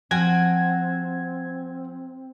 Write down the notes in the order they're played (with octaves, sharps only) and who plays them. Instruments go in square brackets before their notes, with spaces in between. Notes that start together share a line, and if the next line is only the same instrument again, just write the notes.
[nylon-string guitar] F3 [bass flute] C4 [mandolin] F#4 G5 G#5 [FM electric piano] G#6